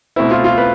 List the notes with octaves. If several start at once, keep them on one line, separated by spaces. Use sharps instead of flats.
B2 A3 C4 E4
F4
F4
B4